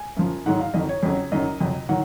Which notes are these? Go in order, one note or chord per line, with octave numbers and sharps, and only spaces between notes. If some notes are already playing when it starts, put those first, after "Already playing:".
Already playing: G#5
F#2 F3
G#2 D#3 F#3 F#5
F5
F2 D#3 F#3 D#5
C#5
F2 C#3 F#3
F#2 D#3 F#3 D#5
F2 C3 F#3
D#3 F#3 F#5